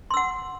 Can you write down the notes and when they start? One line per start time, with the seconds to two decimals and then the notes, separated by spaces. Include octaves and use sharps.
0.11 C6
0.14 E6
0.17 F#5